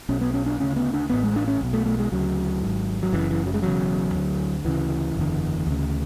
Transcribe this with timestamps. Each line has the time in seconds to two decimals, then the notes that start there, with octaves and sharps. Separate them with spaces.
0.09 B1 B2 C#4
0.21 B3
0.34 C#4
0.46 D4
0.60 D2 C#3 C#4
0.76 B3
0.94 D4
1.10 A1 A2 B3
1.23 G#3
1.36 D4
1.48 C#4
1.61 B1 B2
1.73 A3
1.86 A3
1.99 G#3
2.12 D2 C#3 F#3
2.62 G#1 G#2
3.03 F#3
3.12 F#1 F#2 C#3 E3
3.30 E3
3.46 F#3
3.54 G#3
3.63 E1 E2 C#3 F#3
4.14 D2 D3
4.64 D2 C#3 E3
5.15 F#1 E2 D3
5.67 D2 C#3